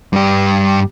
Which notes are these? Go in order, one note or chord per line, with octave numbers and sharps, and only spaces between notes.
G2 G4